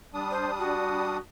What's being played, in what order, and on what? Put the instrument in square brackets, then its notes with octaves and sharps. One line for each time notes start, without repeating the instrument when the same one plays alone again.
[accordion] G3 D4 D#6
[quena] C5
F#4